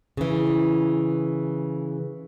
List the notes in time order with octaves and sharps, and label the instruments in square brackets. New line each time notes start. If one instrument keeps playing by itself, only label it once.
[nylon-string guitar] C#3 E3